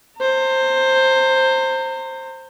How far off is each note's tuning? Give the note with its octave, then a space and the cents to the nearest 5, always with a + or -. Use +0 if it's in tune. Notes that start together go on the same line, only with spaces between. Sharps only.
C5 +10 A#5 -35